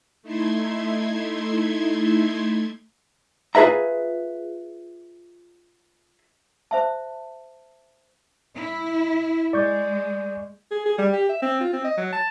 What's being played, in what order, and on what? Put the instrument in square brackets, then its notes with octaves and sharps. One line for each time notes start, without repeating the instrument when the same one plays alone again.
[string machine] A3 D#4 E4 C6 G#6
[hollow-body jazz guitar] F4 G#4 B4 E5 A#5
[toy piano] C5 E5 A5
[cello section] E4
[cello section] G#3 [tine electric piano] D5 C#6 G6
[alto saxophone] G#4
G#4
G3
G4
E5
C4
F4
C4
D#5
F#3
A5